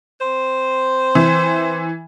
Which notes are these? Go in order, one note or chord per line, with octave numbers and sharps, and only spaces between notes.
C4 C5
E3